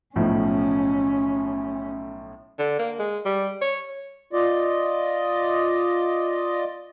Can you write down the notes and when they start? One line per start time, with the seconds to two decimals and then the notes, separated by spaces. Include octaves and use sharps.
0.16 B1 A2 F3 C#4
2.59 D3
2.79 A#3
2.99 G#3
3.25 G3
3.62 C#5
4.33 F4 D5 D#5